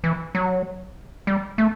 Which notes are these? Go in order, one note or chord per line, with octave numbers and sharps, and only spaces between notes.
E3
F#3
G3
A3